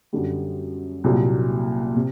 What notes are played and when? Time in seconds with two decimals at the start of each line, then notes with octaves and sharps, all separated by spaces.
0.13 F#2 D3 G3
1.04 C2 A#2 F#3
1.95 C3